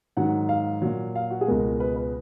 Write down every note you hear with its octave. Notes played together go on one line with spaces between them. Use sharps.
G#2 D#3 F#3 F#5
F5
A#2 F#3
F5
F#4
G#4
C#2 B2 G#3 A#4
B4
B4